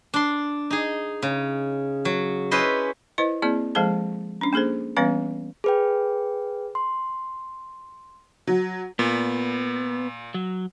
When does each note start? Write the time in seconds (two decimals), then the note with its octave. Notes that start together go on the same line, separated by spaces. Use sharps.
0.14 D4 C6
0.70 D#4 G#4
1.22 C#3
2.05 F#3
2.51 C#4 E4 B4 C5 D#5
3.18 E4 B4 C5 D#5
3.42 A#3 C4 E4 G#4 D5
3.75 F3 G#3 G#4 A4 C5 A5
4.41 C#4 D4
4.53 A#3 D4 G#4 A4 C5
4.97 E3 G3 B3 C#4 B4 F5
5.64 G#4 B4 G5
6.75 C6
8.47 F#3
8.99 A#2 B3
10.34 F#3